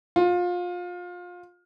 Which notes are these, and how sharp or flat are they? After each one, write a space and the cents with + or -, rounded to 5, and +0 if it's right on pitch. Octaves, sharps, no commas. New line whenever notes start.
F4 +25